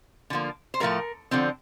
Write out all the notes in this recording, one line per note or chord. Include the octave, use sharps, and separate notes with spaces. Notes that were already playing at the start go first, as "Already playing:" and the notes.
D3 F3 A#3
C5
A2 F3 A3 A#4
D3 F3 C4